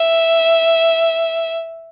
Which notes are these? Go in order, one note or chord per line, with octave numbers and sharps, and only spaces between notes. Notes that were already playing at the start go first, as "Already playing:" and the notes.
Already playing: E5